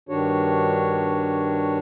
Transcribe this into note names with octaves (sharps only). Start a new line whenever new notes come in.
G2 D#3 D4 F#4 C#5